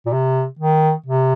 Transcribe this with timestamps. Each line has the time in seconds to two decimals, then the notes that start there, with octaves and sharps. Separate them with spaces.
0.06 A#2
0.12 C3
0.59 D#3
1.06 C3